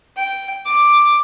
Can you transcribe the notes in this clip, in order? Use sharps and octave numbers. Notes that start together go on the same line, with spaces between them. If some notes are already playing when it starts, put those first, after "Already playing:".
G5
D6